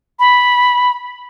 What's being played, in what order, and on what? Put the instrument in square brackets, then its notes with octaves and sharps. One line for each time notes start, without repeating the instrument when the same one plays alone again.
[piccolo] B5